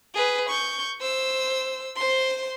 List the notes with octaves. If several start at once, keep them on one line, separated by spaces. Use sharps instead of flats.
G#4 B4
C#6 G6
C5 E6
C5 C6